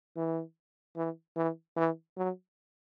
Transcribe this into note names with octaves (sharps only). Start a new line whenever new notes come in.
E3
E3
E3
E3
F#3